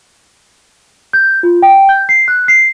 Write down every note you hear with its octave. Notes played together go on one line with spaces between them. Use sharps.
G6
F4
G5
G6
C7
F#6
C7